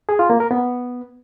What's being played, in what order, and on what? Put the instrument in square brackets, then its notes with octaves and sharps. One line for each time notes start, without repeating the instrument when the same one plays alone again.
[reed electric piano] G#4
F4
A#3
A#4
B3